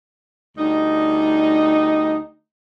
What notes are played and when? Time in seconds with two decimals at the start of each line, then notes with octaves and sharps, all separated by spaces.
0.57 D2 G3 D#4